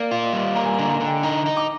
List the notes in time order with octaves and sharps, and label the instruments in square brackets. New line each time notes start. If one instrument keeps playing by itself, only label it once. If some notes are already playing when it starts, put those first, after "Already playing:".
Already playing: [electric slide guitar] A#3 [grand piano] D5
[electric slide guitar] F4
[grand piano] D#5
[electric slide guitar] G3
[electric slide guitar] A#3 [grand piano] A#5
[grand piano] G#5
A#5
[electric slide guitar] D3
[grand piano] A#5
[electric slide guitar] D3
[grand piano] G5
[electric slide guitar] D#4 [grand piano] A#5
[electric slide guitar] D#4
[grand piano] D6